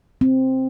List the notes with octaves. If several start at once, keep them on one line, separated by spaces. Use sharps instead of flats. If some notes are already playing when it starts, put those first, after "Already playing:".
C4